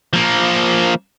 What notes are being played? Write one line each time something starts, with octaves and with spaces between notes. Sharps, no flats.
F3 A#3